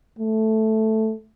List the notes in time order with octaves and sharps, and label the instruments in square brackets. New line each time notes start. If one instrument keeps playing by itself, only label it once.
[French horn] A3